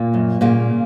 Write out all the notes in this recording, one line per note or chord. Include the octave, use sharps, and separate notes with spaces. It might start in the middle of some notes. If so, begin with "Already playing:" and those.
Already playing: A#2 A#3
F#2
A#2 C#3 A#3